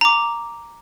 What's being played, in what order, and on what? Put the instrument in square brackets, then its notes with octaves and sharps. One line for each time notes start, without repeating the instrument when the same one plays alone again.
[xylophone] A#5 D6